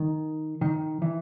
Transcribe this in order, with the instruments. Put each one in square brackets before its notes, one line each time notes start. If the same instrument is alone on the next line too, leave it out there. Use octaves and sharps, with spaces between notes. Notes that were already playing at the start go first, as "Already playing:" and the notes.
Already playing: [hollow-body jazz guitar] D#3
D#3
E3